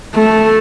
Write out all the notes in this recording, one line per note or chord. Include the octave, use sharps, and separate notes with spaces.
A3